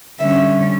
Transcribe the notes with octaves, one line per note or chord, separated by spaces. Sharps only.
D3 G3 C#4 E5